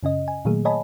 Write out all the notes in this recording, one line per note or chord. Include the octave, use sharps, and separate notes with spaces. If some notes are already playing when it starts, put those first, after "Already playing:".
F#2 C#3 C#4 D#5
G#5
A#2 D#3 F#3 A3 A#3 G#4
C#5 D#5 G#5 A5 B5